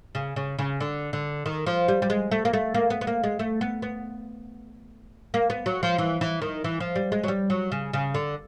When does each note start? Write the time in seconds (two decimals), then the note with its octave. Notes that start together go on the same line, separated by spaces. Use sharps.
0.15 C#3
0.36 C#3
0.59 C#3
0.80 D3
1.13 D3
1.46 D#3
1.66 F3
1.88 G3
2.02 G3
2.10 G#3
2.31 A3
2.45 A#3
2.53 A3
2.74 A#3
2.90 B3
3.01 B3
3.07 A#3
3.24 G#3
3.39 A3
3.61 B3
3.82 B3
5.34 A#3
5.50 B3
5.66 F#3
5.83 F3
5.98 E3
6.21 E3
6.42 D#3
6.64 E3
6.80 F3
6.96 G3
7.12 G#3
7.24 F#3
7.28 G3
7.50 F#3
7.72 C#3
7.93 C#3
8.14 D3